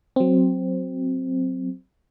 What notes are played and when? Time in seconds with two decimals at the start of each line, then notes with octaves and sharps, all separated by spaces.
0.16 F#3 C4